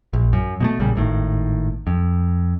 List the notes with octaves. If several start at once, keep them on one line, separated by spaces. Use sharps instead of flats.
A#1
F#2
B2 G3 A3
A#1 A#2 C#3 G3
G#1 A2 D#3
F2